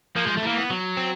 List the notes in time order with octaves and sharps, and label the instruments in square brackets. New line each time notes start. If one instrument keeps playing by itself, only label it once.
[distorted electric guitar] F3 [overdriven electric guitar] A#3
[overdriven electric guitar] G#3
A3
[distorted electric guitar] E3 [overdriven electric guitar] A#3
[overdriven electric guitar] B3
[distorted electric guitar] F#3
[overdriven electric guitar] C4